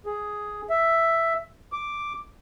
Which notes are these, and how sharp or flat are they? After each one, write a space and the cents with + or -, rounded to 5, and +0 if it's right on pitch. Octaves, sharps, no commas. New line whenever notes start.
G#4 +5
E5 +5
D6 +0